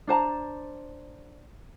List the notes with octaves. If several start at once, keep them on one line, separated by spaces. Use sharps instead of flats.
D4 C5 A5 A#5